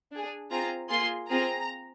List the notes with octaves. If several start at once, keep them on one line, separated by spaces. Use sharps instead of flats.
D4 G#4
C4 F4 G#4 A#5
A#3 F4 G#4 C6
C4 F4 G#4 A#5